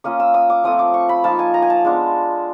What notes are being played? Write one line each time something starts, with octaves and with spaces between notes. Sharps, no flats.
A#3 C#4 F4 D#6
E6
D#6
D6
F3 A3 C4 D#6
D6
C#6
B5
F3 A#3 D#4 A5
G#5
A#5
G#5
A5
G#3 B3 D4 F4